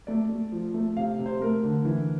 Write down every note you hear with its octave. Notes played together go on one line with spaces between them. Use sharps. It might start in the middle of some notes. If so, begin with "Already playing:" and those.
A3 D5
A3
F3
A3
C3 F5
C3
C5
A3 A#4
D3
E3